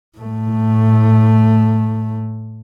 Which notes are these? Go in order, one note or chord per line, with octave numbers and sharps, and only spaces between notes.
A2 A3